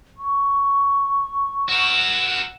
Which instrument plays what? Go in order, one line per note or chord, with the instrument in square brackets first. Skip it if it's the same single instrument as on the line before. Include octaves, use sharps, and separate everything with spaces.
[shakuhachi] C#6
[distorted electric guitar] F#4 A#4 [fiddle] F#5 E6